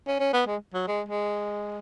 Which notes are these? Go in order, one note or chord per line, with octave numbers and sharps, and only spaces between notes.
C#4
C#4
B3
G#3
F#3
G#3
G#3